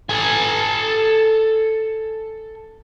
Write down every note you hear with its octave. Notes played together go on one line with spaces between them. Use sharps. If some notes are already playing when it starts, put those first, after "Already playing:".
A4 G#5